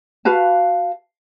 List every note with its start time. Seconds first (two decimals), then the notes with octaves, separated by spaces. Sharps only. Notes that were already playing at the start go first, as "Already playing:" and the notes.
0.25 F#4 B4 F5 A5